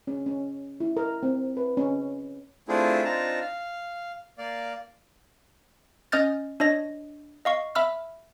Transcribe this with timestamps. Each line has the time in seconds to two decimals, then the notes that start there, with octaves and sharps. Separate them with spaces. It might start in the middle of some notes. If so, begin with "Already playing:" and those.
0.07 C#4
0.26 C#4
0.80 E4
0.97 A#4
1.23 C4
1.57 B4
1.77 C#4
2.69 A3 C4 D4 E4 F4 G#4
3.05 C4 D4 D#4 F4 A5 A#5
3.41 F5
4.38 A#3 D5 F5
6.12 C#4 D#5 D#6 F6 G6 A6
6.60 D4 C#5 D#5 A#6
7.45 D#5 F5 C#6
7.75 E5 B5 E6 F6